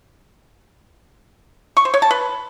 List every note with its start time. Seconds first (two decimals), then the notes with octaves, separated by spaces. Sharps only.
1.77 C#6
1.85 C5
1.94 C#5
2.02 A5
2.11 B4